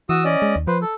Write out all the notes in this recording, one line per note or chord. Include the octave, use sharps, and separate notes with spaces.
E3 F#4 D#6 E6
C#4 D5 D#5
G#3
D#2
F3 B4 C5
A4